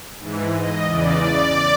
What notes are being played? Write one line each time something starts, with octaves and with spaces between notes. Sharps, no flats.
G#2 E3
D#5
E2 C#3 E3 D5